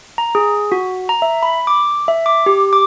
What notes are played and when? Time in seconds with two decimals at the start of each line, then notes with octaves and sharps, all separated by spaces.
0.18 A#5
0.35 G#4
0.72 F#4
1.09 A#5
1.22 E5
1.43 B5
1.67 D6
2.08 E5
2.26 D6
2.46 G4
2.73 D6